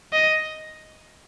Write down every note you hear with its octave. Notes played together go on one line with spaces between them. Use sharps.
D#5